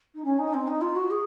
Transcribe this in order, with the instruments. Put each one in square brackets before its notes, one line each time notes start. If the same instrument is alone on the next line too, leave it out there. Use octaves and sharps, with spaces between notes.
[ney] D#4
C#4
D#4
C4
D#4
F4
F#4
G#4